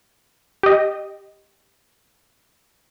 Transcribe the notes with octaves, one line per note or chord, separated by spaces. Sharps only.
G4 D#5